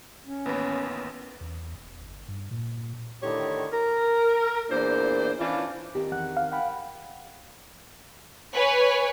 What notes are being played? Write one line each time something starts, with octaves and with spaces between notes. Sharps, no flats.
C#4
A1 D#2 B3 C#5
E2
E1
G1
G2
A#2
A2 D3 D#3 G4 C#5
A#4
E2 A#2 A#3 D4 C5
E3 C#4 D4 F4
D#3 C4 G4
E2 F#5 F#6
F5
F#5 G5 B5
B4 C#5 G#5